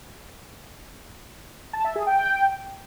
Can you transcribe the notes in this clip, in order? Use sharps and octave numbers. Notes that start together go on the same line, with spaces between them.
A5
E5
G#4
G5